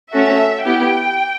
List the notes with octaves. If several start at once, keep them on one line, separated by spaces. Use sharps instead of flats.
A3 C#4 F#4 A4 E5
B3 E4 G4 G5